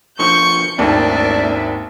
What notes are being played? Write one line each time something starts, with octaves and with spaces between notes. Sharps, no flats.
B2 D3 F3 C#6 G6 C#7
G#1 D#2 A#2 C#3 A3 D4 D5 E5